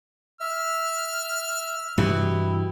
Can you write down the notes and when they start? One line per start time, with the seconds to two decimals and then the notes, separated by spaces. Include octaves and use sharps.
0.40 E5 F6
1.98 G2 C3 E3 E4 F#4 G4 D#5